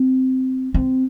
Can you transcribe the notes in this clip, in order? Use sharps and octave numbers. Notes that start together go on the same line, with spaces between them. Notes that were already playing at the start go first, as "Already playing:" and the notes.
Already playing: C4
C4